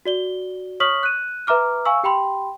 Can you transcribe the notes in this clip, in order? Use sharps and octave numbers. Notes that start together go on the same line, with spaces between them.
F#4 D5 G7
C#5 C#6 D#6 F6 B6 F#7
F#6 D#7
B4 E5 A#5 D6 F6
F5 G#5 C#6 E6
G4 G5 B5 C6